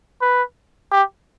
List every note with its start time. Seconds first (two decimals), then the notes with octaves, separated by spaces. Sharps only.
0.22 B4
0.92 G4